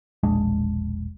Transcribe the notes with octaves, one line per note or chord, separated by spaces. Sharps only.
E1 A#1 G#3 D4